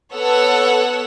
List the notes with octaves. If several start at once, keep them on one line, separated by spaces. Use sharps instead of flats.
B3 A4 C#5 F#5 E6